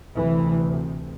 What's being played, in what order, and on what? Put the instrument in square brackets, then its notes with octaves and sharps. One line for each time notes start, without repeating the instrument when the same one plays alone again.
[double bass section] D2 C3 E3